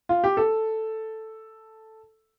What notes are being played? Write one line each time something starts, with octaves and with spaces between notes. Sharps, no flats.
F4
G4
A4